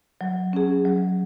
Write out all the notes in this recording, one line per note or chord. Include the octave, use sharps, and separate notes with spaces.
F#3
C#4 G#4
F#3